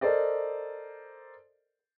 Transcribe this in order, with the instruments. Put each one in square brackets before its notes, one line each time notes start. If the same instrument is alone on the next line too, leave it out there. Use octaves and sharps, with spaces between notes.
[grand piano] A4 A#4 C5 D5 D#5